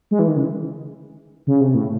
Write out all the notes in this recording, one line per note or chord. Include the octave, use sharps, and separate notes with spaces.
G#3
E3
D#3
C#3
C#3
C3
A2